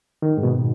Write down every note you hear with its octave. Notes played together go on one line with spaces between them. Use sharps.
D#3
G#2
B2